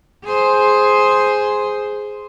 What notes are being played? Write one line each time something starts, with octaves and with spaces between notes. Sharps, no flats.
G#4 C5